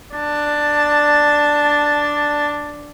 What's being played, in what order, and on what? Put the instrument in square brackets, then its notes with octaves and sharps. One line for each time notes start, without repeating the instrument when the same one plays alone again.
[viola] D4 A5